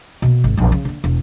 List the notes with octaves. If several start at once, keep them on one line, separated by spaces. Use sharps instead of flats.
B2 A#3
G#1
A#1 F#2
C#3
D3 A#3
E1